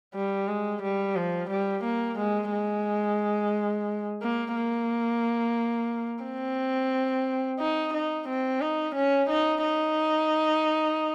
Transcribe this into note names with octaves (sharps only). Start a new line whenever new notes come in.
G3
G#3
G3
F3
G3
A#3
G#3
G#3
A#3
A#3
C4
D#4
D#4
C4
D#4
C#4
D#4
D#4